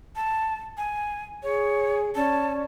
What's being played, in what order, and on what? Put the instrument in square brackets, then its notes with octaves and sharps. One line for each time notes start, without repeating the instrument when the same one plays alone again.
[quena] A5
G#5
[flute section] G#4 [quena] C#5
[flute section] C#4 D5 [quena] A5